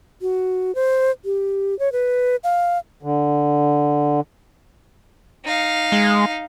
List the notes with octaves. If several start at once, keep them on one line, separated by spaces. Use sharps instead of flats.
F#4
C5
G4
C#5
B4
F5
D3
D#4 F5
G#3